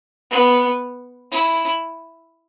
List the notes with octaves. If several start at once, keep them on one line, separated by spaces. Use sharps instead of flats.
B3
E4